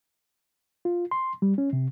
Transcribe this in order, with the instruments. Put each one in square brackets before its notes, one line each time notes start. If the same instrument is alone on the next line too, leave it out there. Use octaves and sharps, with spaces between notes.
[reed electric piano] F4
C6
G3
C#4
C3